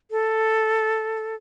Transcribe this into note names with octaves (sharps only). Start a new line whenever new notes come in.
A4